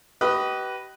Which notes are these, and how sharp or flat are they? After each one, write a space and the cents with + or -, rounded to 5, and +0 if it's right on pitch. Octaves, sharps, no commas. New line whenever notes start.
G4 -35 B4 +0 D#5 +0